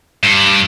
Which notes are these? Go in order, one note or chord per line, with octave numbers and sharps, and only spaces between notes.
G2